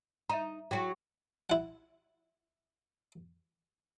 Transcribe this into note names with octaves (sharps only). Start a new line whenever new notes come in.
D#4 E5 A#5
F#3 E4 F#4 G#4 G5
E4 F#5